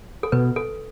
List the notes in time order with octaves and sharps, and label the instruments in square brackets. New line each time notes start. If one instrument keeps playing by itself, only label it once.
[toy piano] A4
[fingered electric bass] B2 [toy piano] B4
[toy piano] A4